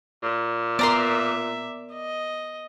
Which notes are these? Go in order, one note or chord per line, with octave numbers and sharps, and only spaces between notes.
A#2
B3 A#4 D5 E5 A#5 C6
D#5